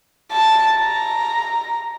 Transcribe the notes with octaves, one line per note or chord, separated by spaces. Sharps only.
A5
A#5